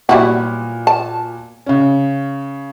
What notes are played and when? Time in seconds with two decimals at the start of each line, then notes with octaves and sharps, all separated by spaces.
0.09 A#2 F#3 G3 B3 E4 F#4
0.87 A5
1.66 C#3 C#4